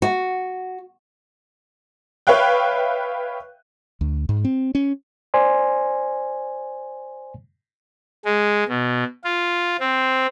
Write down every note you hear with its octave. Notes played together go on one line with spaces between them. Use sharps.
F#4
B4 C#5 E5 F5 G5 F#6
D2
G#2
C4
C#4
C5 D5 G#5 C6
G#3
B2
F4
C4